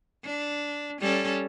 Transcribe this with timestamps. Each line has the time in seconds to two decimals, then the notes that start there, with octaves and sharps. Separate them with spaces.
0.24 D4
1.01 G3 C#4 A4